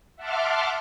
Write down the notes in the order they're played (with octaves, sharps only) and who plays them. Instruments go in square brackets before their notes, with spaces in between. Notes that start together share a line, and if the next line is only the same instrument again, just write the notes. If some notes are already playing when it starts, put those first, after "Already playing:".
[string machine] E5 F#5 A5 C6 D6 F6